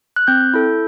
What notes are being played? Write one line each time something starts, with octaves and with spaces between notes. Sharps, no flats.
F#6
C4 G6
E4 A4